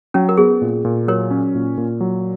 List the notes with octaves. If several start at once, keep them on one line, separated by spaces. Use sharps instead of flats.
F#3 C#4
A#4
B3 G#4
A#2
A#2
F#3 A#4 C#5
C#4
A#2
A#2
F#3